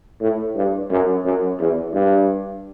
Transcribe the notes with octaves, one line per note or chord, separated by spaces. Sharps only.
A2
G2
F#2
F#2
E2
G2